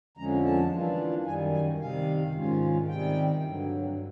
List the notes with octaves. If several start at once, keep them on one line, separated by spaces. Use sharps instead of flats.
F2 D3 F3 G#3 C#4 A#5
A5
E3 G3 A#3 D4 F4
F#2 D#3 G3 G#5
G#5
C3 D#3 G3 F5
G#2 D#3 G#3 C#4 F4
C3 D#3 G3 G5
G2 D3 F#3